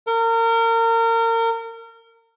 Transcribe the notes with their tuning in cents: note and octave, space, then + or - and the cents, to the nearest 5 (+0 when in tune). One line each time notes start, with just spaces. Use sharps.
A#4 -30